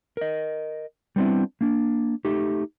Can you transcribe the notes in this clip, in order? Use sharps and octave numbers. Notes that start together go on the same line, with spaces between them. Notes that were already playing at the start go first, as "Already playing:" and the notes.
A#4 D#5
G3 B3 C4 D4 E4
A#3 D4
A3 D#4 G4